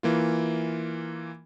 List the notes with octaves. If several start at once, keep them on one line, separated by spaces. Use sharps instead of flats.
E3 A#3 F4